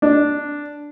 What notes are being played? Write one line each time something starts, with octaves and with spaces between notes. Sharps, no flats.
D4